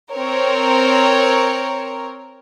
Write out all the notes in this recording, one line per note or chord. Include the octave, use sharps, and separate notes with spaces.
C4 A#4 C#5